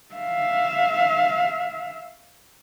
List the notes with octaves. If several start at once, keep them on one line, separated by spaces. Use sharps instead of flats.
E5 F5